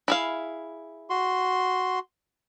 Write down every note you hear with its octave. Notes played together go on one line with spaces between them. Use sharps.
E4 G#4 F5
F#4 C6